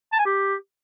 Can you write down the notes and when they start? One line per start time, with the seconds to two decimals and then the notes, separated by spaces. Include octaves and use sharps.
0.13 A5
0.19 G#5
0.25 G4